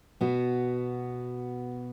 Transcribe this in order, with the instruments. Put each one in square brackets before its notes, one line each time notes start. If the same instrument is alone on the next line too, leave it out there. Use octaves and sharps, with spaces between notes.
[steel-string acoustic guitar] B2 B3 F#4